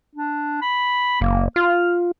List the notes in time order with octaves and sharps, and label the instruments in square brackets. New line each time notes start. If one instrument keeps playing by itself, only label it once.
[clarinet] D4
B5
[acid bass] F#1 [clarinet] A#3
[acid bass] F4 [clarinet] F6